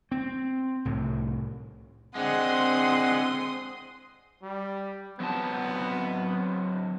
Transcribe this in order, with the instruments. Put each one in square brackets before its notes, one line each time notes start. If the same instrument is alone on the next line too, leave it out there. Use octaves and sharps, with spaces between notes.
[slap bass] C4
C2 A2
[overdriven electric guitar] D3 G#3 [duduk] C4 [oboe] F#5 [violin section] C6 D#6
[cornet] G3
[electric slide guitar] F#3 C4 A5 [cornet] B3